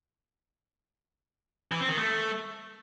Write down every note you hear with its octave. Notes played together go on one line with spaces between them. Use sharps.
E3
C4
D#3
A3